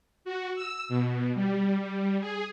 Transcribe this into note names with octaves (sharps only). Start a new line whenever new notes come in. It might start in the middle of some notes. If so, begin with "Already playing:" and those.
F#4
E6
B2
G3
G3
G#4